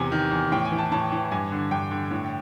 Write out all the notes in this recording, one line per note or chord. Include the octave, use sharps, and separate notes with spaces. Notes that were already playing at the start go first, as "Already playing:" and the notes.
Already playing: E2 C3 G#5
D#3
E2
A2 G5
G#5
E3
A5
A2 A5
E3
G2 G#5
D3
G2 G5
D3
A2